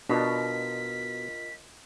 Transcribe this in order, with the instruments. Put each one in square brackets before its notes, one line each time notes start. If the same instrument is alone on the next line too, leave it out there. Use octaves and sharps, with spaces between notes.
[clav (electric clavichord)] B2 [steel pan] D4 [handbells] F4 A#4 D#5 [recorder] B6